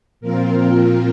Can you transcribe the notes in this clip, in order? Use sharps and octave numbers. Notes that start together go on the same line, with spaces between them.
A#2 F3 C4 F4 A#4